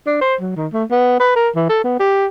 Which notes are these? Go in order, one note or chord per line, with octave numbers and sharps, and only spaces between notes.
D4
C5
F#3
D#3
A3
B3
B4
A#4
E3
A4
B3
G4